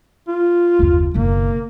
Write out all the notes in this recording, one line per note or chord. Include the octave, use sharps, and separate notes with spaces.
F4
F#1 D#2
F#1 B2 A#3